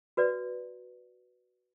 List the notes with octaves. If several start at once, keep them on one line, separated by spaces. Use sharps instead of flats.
F#4 B4 D5